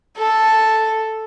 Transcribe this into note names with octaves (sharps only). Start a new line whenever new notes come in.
A4